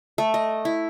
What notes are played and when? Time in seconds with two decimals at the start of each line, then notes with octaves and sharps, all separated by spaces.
0.18 A3
0.34 D#5
0.65 E4